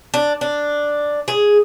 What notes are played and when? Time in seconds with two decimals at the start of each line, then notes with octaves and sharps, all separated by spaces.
0.14 D4
0.41 D4
1.28 G#4